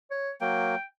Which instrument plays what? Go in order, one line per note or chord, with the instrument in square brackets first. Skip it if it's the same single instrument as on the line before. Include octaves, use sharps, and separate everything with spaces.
[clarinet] C#5
[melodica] F#3 A#3 [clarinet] G5